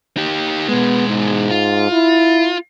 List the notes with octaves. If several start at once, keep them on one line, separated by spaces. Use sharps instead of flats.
D#4 G4
B2 G#3 B3
G#2
F4
E4